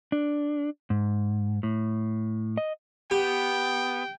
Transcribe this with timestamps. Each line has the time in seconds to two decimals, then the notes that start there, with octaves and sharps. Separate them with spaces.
0.12 D4
0.90 G#2
1.63 A2
2.57 D#5
3.11 B3 G4 G5